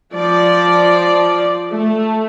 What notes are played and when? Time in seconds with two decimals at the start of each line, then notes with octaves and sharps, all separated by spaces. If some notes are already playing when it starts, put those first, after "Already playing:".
0.12 F3 D5
1.71 A3